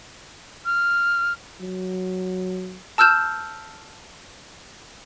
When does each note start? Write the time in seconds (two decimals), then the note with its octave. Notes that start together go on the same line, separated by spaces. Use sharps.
0.66 F6
1.61 F#3
2.98 A5 E6 F6 G6 E7